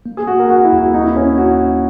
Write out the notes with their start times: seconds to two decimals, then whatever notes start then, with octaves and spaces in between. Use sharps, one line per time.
0.06 A#3
0.17 G#4
0.27 A#3 F#4
0.39 A#4
0.49 A#3 F#4
0.64 E4
0.72 D#2
0.79 F#4
0.93 A#3 D#4
1.04 E4
1.15 D#2 C#4
1.37 F#4